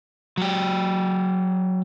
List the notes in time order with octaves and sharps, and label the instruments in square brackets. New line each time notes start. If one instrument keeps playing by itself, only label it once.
[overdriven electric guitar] F#3 G4